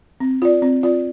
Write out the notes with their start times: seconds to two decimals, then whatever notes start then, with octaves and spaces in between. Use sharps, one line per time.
0.20 C4
0.42 F4 D5
0.62 C4
0.83 F4 D5